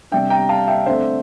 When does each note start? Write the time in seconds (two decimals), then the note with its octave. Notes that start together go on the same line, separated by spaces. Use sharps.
0.11 C3 G3 D4 E5 G5
0.30 G5 A#5
0.49 F5 A5
0.68 E5 G5
0.86 D3 A3 C4 C5 E5